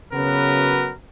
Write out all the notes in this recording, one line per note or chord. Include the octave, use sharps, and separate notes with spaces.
C#3 F#3 B3 F#4 A#4 B4